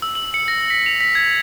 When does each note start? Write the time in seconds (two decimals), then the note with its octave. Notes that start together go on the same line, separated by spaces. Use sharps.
0.02 E6
0.15 F#7
0.34 C#7
0.48 A#6
0.70 B6
0.86 F7
1.01 B6
1.15 G#6